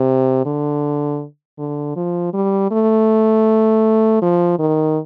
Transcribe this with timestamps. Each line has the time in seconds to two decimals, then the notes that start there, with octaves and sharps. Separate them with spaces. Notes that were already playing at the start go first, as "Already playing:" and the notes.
Already playing: C3
0.46 D3
1.58 D3
1.96 F3
2.33 G3
2.71 A3
4.22 F3
4.59 D#3